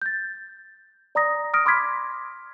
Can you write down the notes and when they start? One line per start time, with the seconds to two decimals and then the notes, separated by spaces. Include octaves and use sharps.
0.02 G6 A6
1.15 D5 A#5 D#6 A#6
1.54 D#6 F6 A#6 D7
1.65 B5 C6 D6 F6 G#6 B6